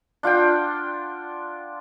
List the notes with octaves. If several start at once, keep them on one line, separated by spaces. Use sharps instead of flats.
D4 F4 F#5 G5